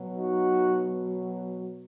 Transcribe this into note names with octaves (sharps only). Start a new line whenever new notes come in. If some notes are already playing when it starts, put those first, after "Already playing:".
Already playing: B2 F#3
D#4 F#4